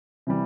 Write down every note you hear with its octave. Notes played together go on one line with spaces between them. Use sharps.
C3 E3 G3